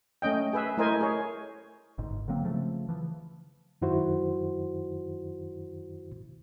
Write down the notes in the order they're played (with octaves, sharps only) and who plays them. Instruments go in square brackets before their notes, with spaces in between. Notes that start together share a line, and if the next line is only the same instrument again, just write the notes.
[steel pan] A3 C#4 D#5 G5
G#4 B4 E5
A3 E4 A#4 C5 D#5 G#5
G#4 C#5
[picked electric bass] G1 G#2
D3 F#3 A#3 C4
C#3 F3 A3
E3 F3
[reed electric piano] F#2 D#3 E4 F#4 C5